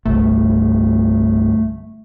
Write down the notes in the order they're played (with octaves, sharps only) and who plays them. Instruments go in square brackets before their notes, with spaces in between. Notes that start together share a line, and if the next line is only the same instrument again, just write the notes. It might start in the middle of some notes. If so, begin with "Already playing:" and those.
[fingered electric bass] G1 C2 [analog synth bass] A3